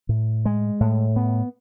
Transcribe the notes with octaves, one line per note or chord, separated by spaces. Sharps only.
A2
G#3
A2
B3